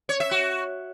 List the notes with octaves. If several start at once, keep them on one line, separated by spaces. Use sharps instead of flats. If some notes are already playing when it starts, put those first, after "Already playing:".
C#5
E5
F#4